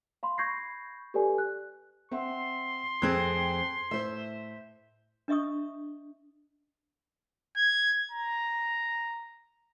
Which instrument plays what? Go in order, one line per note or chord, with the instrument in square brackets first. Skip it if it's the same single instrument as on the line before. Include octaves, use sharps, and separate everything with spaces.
[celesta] F5 B5 C6
B5 C#6 G6 G#6 A#6 C7
G4 A4 B4 D5 G#5
F#6
[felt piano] C4 E5 F#5 [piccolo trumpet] C6
[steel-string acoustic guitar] F2 C4 G#4 [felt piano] F#6 G#6
[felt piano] A2 [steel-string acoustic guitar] C5 E5
[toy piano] D4 D#5 E5 C#6 D#6
[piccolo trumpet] G#6
A#5